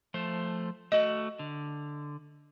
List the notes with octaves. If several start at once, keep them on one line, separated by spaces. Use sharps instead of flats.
F3 A3 C5
A3 F#4 D#5
D3